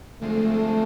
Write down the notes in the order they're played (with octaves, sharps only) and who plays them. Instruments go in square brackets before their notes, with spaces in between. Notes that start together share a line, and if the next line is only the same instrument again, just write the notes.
[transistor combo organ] D3 F3 G#3 C4 [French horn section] A3